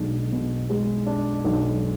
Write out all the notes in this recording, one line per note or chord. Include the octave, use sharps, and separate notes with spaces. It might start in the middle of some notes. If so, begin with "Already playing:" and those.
Already playing: B1 B2 G#3 D4
B2
G#3
D4
B1